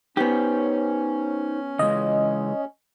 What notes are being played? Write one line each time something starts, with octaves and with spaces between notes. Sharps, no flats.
B3 C#4 D#4 G4 C5 C#5
C#3 E3 G#3 D#5